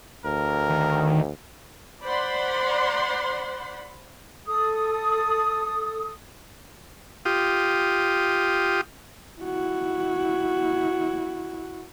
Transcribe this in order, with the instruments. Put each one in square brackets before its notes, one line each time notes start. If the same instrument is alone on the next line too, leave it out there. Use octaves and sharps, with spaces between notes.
[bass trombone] D2 [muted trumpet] A#4
[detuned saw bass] D#3
[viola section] C5 D5 F#5 B5 C6
[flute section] A4 D#6
[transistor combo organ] F4 G4 D#6
[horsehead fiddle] E4 F#4